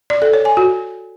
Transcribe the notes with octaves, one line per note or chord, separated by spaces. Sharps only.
D5
A4
C#5
G#5
F#4